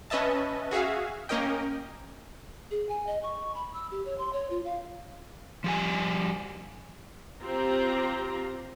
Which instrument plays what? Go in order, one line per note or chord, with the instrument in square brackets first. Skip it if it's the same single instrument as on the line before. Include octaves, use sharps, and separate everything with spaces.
[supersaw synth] C#4 B4 D#5 E5 A5
F#4 G#4 E5 F5
A#3 C#4 A#4 D#5 G5
[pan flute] G#4
G#5
D#5
C#6
B5
E6
G4
C#5
C6
C#5
F4
F5
[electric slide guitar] F3 G3 G#5
[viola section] C4 F4 G4 A#5